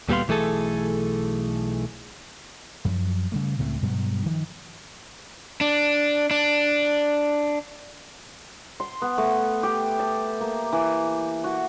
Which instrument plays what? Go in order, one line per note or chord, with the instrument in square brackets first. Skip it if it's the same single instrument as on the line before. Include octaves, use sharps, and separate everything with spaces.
[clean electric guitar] D2 A#2 G3 B3 F5 C6
B1 E3 A3 G#4 A4
[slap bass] F#2 F3
C#3 G3 A3
C#2 A2 A3 C4
G2 B2 F#3
D#3 F3
[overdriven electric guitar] D4
D4
[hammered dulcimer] C6
B3
A3
G4
A5
A#3
E3
F#4